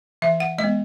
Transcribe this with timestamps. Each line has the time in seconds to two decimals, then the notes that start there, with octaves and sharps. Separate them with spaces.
0.22 E3 E5
0.40 F#5
0.58 G#3 D#5
0.64 B3